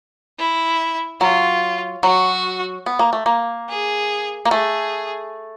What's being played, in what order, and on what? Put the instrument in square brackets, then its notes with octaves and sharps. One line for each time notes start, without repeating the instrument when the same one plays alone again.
[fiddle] E4
[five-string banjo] F#3 [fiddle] F4
[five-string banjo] F#3 [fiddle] F#4
[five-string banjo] B3
A#3
A3
A#3
[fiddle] G#4
[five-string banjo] A#3
[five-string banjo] A3 [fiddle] G#4